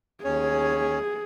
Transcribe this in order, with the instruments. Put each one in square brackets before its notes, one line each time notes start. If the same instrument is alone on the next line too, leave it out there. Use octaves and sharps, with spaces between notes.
[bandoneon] D#2 C#4 C#5 [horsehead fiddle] G#4